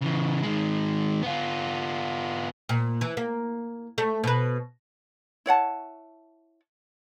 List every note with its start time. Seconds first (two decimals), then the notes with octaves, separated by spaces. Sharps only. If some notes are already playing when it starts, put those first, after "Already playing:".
0.02 C#3 E3
0.43 D#3 G#3
1.22 B3 F4
2.69 A#2
3.01 E3
3.17 A#3
3.98 A3
4.24 B2 B4
5.46 E4 C#5 F#5 A5